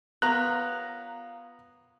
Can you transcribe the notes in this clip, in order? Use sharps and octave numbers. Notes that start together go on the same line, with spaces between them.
B3 F4 A#4 C#5 A#5 F#6